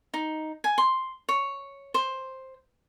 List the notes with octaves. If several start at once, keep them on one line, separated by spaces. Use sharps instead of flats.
D#4
G#5
C6
C#5
C5